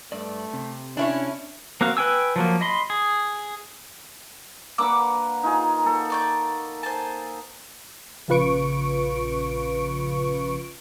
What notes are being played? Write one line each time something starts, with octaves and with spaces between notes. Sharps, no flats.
G2 A3 D5
C3
C#4 D4 E4 C#5
A#3 C4 F#4 F5
B4 G5 G#5 E6
F3 F#3 A#3
D#5 B5 C6
G#4
A#3 D4 B4 F#5 D6 E6
D#4 F4 G#4
A#3 A4 F#5
D5 C#6 G6
C5 G#5 A5
A#1 C#3 F4 B4 C#6 D7